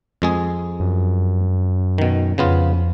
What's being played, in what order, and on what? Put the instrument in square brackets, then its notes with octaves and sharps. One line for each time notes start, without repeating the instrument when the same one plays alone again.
[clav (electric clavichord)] F2 G#3 G#4
[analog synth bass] F#2
[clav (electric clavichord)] B2 D#3
[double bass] F2 [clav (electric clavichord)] C#3 B3 F4